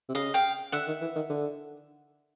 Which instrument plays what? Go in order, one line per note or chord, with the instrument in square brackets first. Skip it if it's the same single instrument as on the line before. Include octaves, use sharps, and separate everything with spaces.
[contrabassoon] C3
[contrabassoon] C#3 [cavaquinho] D#5 F5
[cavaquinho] F5 G5
[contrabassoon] D3 [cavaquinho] E5 F#5
[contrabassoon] D#3
E3
D#3
D3